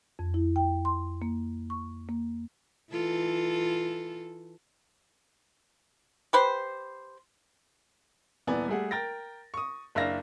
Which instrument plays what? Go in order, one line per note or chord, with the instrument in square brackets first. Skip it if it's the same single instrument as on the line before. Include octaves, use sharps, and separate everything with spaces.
[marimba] F2
E4
G5
C6
A#3
C#6
A#3
[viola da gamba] E3 F4 A4
[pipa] G4 B4 C5
[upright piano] D#1 E3 B3 D5 G#5
G3 A3 G#4 F#5
A#4 G5 A6 A#6
C#6 D#6
F#1 D4 E5 F5 A#6